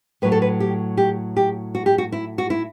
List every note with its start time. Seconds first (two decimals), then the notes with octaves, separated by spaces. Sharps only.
0.22 A2 F#3 A3 B4
0.32 A4
0.42 B4
0.60 G4
0.97 G4
1.37 G4
1.75 F#4
1.86 G4
1.98 F#4
2.12 E4
2.38 F#4
2.50 E4